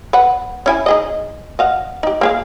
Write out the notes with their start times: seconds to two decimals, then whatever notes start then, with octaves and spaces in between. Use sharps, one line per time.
0.13 B4 F#5
0.66 C#4 E4 G#5
0.86 D#4 G#4 D#5
1.59 D#5 F5 F#5
2.03 D#4 G4
2.21 A#3 G#4 F5